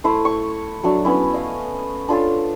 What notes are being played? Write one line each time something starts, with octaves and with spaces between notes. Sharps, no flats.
A3 E4 C5
C#6
F#3 A3 D4
B3 C#4 E4
D#5 F5
D4 F4 A4 C#5